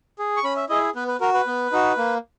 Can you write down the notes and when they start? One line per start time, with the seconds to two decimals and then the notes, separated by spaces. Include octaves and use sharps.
0.19 G#4
0.37 C#6
0.44 C#4 B5
0.56 E5
0.69 E4 G#4 D#5
0.95 B3 B4
1.08 B4
1.21 F#4 A#4
1.34 B4
1.47 B3
1.72 D#4 F#4
1.98 A#3